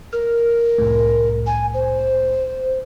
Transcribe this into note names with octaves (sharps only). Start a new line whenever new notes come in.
A#4 F6
C2 F2 A2
G#5
C5